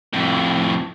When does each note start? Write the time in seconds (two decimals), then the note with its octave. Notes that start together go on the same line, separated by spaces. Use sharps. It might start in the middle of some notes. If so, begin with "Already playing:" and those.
0.13 F2 A2